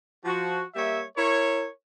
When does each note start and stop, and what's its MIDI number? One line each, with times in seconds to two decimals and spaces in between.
0.25 0.63 53
0.25 0.63 66
0.75 1.01 55
0.75 1.01 58
0.75 1.01 73
0.75 1.01 76
1.17 1.65 64
1.17 1.65 70
1.17 1.65 73